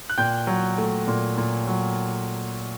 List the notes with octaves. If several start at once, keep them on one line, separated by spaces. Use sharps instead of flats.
F#6
A#2 G5 G6
F#3
A3
A#2
A#2
F#3